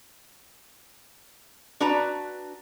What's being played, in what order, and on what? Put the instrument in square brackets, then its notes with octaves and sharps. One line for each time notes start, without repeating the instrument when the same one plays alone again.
[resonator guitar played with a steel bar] D4 F#4 B4 A#5